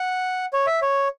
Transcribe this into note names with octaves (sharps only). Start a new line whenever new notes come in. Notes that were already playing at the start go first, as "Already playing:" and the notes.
Already playing: F#5
C#5
E5
C#5